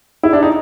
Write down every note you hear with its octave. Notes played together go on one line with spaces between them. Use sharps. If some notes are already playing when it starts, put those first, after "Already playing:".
E4
D4
D#4